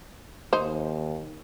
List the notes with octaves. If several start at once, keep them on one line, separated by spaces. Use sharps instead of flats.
D#2 D#4 C5